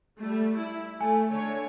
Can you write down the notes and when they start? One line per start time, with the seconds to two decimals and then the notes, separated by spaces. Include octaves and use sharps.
0.19 G3 A3
0.58 E4
1.01 A3 G#5
1.30 D3 A3 C#5